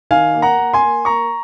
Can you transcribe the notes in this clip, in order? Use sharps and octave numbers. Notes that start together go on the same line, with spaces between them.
D#3 F5 G#5
A#3
F#5 A#5
A#3
G#5 C6
A#3
A#3 A#5 C#6